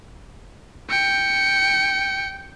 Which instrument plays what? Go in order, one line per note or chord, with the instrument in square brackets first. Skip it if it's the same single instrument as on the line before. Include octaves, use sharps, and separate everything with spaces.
[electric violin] G5 C#7